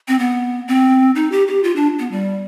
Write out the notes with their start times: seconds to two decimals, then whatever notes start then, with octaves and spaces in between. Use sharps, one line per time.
0.08 C4
0.19 B3
0.68 C4
1.15 D#4
1.32 G4
1.48 G4
1.63 F4
1.76 D4
1.99 B3
2.11 G3